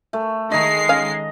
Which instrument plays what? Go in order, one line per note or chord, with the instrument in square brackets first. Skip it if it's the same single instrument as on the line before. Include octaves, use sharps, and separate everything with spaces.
[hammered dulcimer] A3
[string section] D#3 G#3 C7 [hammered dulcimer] D#5 A#5
[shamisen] C#4 F5